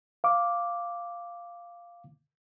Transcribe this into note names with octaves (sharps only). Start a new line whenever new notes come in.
F5 D6